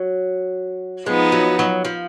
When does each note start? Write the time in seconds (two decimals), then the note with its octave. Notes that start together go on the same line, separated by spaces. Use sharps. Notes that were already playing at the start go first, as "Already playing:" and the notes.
Already playing: F#3
1.06 F3 G#3 B3 D#4
1.32 F#3
1.59 F#3
1.85 F3